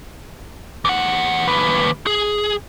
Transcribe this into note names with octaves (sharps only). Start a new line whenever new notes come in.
E2 F#5
D#2 B4
G#4